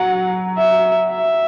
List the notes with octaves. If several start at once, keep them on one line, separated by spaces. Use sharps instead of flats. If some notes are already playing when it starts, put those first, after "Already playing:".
Already playing: F#3 F#5
E5
E5